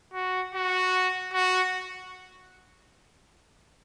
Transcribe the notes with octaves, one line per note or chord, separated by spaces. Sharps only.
F#4
F#4
F#4